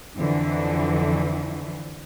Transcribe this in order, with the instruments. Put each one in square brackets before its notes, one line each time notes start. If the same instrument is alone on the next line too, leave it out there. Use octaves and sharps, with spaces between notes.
[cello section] F2 D3 E3